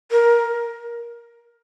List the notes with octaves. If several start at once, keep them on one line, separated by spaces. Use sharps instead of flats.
A#4